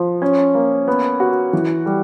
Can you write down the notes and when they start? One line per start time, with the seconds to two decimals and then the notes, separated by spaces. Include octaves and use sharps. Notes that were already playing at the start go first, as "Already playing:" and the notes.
Already playing: F3
0.22 C#4
0.55 A#3
0.87 B3
1.20 F#4
1.53 E3
1.86 G3